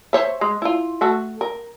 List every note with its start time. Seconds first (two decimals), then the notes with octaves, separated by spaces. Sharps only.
0.13 C5 C#5 E5
0.41 G#3
0.62 E4 F4
1.01 A3 F#4 A4
1.41 A#4